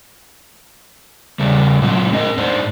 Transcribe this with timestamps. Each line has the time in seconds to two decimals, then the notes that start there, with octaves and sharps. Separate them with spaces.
1.40 C#3 G3
1.82 A#2 F#3 G#3 C4 E4
2.13 C4 A#4 D#5
2.37 G#2 D4 C5